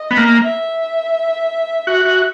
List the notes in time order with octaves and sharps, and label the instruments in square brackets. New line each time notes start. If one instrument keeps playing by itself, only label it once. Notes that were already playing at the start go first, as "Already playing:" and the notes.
Already playing: [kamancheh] D#5
[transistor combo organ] B3
A#3
[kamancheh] E5
[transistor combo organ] F#4
F#4